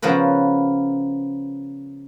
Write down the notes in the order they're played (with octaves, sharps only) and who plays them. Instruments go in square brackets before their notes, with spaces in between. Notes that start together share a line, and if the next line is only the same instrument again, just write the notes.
[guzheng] C#3 F3 B3 A#4 B4